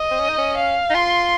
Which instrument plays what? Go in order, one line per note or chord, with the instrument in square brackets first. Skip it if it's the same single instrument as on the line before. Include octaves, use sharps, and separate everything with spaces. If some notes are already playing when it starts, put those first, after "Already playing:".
Already playing: [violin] D#5
[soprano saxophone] C4
C#4
D#4
C#4
[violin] F5
[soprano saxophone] D#4
[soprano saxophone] F4 [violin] C6